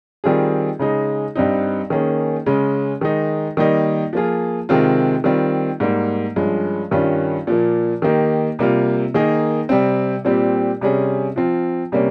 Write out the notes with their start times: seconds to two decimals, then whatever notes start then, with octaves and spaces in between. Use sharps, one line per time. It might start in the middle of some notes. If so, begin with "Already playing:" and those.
0.24 D#3 G3 C4 F4 G#4
0.79 C#3 G#3 D#4 G#4
1.35 G2 G3 C4 D#4
1.90 D#3 A#3 C#4 G#4
2.46 C#3 G#3 C#4
3.01 D#3 G#3 D#4
3.57 D#3 G3 A#3 D#4
4.13 F3 A#3 F4 G#4
4.69 C3 D#3 G#3 C4 F4
5.24 D#3 G3 C4 F4
5.80 G#2 G3 A#3
6.36 G2 F3 G#3 C#4
6.91 G2 D#3 G3 C#4 F4
7.47 A#2 F3 A#3
8.02 D#3 A#3 D#4 G4
8.59 C3 G3 A#3 F4
9.14 D#3 A#3 D#4 G#4
9.69 C3 G3 C4
10.25 A#2 G3 C4 G4
10.81 C3 G3 C#4 G#4
11.36 F3 C4 F4
11.92 C3 G3 A#3 C#4